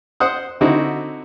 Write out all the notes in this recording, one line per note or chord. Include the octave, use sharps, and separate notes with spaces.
C5 F#5 D#6
D3 C4 D#4 E4 F#4